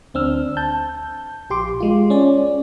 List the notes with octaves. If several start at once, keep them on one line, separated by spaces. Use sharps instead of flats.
D2 C4 D4 E6 F6
A5 G6
A#1 G4 C6 D6
G#3 F4
C#4 D5